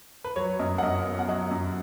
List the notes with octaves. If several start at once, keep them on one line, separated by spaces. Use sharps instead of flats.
B4
F#3 C#5
F#2 D#5
F#5
F#2 D#5
B3
F#5
F#3 D#5
F#2